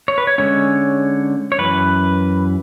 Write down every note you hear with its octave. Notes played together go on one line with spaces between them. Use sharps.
C#5
B4
C#5
D3 G#3 C#4 C#5
C#5
F#2 E3 B4